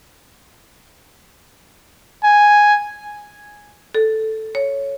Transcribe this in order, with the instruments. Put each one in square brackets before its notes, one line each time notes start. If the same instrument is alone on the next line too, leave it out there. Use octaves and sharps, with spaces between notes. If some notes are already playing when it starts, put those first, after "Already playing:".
[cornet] G#5
[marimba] A4
C#5